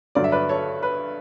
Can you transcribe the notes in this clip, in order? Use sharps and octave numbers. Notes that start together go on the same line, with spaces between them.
G2 D3 F#3 D5
E5
B4 D5
A4 C#5
B4